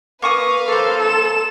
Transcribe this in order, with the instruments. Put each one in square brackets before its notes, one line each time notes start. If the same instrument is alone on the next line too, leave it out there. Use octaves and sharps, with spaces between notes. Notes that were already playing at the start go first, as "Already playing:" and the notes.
[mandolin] A#3 C#6 D#6 [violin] B4 F5
[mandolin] A#3 C5 [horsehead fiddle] A4
[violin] E7